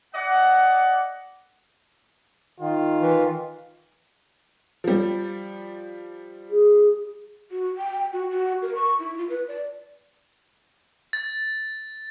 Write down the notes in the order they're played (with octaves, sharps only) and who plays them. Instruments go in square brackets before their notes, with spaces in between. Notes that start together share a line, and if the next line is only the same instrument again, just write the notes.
[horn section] D5 D#5 F#5
[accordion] D#3 [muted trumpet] F4
[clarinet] E3
[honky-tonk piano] F3 G3
[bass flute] G#4
[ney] F#4
G5
F#4
F#4
A#4
C#6
E4
F4
B4
D5
[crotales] A6